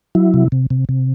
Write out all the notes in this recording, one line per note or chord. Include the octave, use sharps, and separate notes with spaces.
F#3 E4
C3
C3
C3
C3